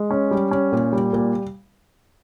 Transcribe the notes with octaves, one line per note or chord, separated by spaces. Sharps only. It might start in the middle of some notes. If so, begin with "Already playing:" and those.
Already playing: G#3
C#4
G3
C#4
A#2
G3
A#2